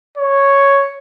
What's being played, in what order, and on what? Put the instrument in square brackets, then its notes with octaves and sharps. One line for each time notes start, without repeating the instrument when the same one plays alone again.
[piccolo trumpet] C#5